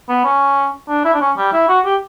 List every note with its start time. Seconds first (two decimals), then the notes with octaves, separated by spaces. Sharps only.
0.09 B3
0.24 C#4
0.89 D4
1.05 E4
1.14 D4
1.21 C#4
1.37 G3
1.53 E4
1.69 F#4
1.85 G4